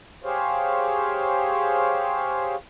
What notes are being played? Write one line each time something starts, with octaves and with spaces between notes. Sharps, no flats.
G4 G#4 C5 C#5 F5